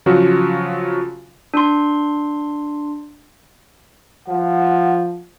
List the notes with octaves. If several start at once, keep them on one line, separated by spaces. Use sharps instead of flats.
C#3 F3 F#3 F#4
D4 C6
F3 F#5